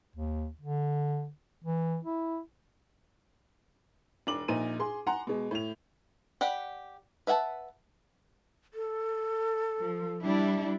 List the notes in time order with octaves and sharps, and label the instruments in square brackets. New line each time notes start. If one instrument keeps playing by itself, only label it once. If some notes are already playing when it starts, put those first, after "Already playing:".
[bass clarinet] D#2
D3
E3
E4
[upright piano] E1 D4 D6 F#7
A#1 A#2 D#4 D#7
G#4 C6
F#5 G#5 A#5 C6
B2 G#3
A2 F7
[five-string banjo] G4 D5 F#5 B5
B4 E5 F#5 G#5 A5
[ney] A4
[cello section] F3
G3 D4 E4